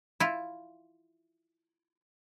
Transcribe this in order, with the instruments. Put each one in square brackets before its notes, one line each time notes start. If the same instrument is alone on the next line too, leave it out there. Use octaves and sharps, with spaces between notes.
[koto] E4 F4